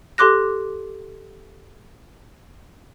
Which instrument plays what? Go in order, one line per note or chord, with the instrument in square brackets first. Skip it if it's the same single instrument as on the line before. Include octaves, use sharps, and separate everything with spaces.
[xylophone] G4 A4 C6 D6 F#6 A#6